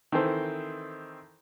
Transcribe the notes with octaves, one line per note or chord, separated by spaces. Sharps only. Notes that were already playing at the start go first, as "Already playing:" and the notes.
D#3 E3 C4 A4 C5